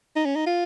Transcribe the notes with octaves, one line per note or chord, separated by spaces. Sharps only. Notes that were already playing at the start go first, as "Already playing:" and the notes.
D#4
C#4
D#4
F4